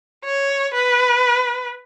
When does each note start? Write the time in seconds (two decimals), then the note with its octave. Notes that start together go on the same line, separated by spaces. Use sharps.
0.25 C#5
0.74 B4